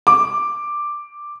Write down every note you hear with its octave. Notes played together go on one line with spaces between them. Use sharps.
D6